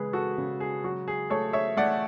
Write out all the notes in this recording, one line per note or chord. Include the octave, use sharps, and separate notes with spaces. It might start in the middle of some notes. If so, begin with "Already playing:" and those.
Already playing: C#3 G#3 G#4 B4
F#4 A4
C#3
G#4
F#3 F#4
G#4
A3 A4 C#5
C#5 E5
A3 D5 F#5